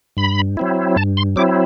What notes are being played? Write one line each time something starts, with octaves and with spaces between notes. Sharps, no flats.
G2 B5
F#3 C4 E4
G2 A5
C6
F#3 C4 E4 D6